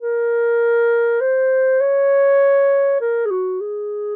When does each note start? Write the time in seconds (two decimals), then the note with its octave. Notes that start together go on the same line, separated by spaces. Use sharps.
0.01 A#4
1.21 C5
1.81 C#5
3.00 A#4
3.25 G#4
3.31 F#4
3.61 G#4